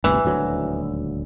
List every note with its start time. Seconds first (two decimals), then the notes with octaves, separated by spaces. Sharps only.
0.04 G1 D2 C3 E3
0.25 D#1 D2 F#3